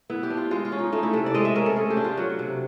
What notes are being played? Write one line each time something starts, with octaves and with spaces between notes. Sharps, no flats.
B3 E4
G4
D4
F4
G#3 F4
F4
C#4
D#4
A3 D#4
E4
C3 A4
D5
G#3 D#5
E5
C#4 A#4
A4
A3 G#4
G4
D4
F4
F#3 F#4
C3